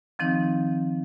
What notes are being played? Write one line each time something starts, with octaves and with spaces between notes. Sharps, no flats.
D#3 F3 C4 D#4